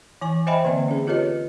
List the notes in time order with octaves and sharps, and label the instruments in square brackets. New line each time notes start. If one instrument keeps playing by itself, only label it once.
[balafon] E3 G#5 C#6
C5 D#5 E5 G5 G#5 B5
D3 A#3 C4 D5
C#4 G#4
F4 G4 A4 B4 C#5 D#5